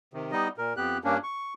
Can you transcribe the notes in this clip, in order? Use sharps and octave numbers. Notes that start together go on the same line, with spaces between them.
C3 D#3
G3 B3 D#4 D#5
A#2 A#4
F2 B3 G4 F#6
G2 A#3 C#4 D4
C#6